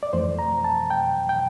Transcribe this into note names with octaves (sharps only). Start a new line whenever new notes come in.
D5
F2 E3 A3 C5
A#5
A5
G5
G5